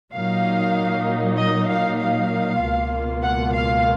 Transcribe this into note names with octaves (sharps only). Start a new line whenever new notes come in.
A#2 F#3 A#3 D#4 F5
D#5
F5
F5
C#2 B2 A#3 F4
F#5
F5